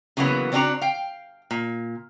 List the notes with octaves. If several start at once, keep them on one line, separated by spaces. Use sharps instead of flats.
C#3 E3 F#3 A#3 B3
C#3 C4 D4 D#4 F#4 A#5
F5 G5
A#2